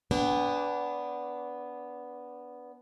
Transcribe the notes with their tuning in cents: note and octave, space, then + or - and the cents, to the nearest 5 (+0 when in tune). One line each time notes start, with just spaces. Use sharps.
B3 +0 D4 -20 G5 +40